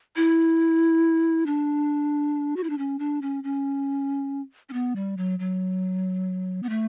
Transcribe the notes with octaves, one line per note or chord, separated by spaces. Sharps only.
E4
D4
F#4
E4
D4
C#4
D4
C#4
C#4
C#4
B3
G3
F#3
F#3
B3
A3